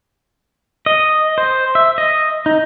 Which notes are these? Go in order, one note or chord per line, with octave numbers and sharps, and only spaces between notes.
D#5
C5
E5
D#5
D#4